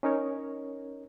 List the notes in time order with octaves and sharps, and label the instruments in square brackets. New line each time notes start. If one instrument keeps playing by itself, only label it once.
[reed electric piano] C#4 D#4 A#4 C#5